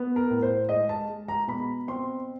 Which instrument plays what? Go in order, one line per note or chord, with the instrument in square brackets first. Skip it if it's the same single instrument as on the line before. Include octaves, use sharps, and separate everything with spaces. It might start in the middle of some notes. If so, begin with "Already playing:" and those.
Already playing: [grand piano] B3
A#4
A2
C5
G#3 D#5
A5
G#3
A#5
B2 B5
C4 C6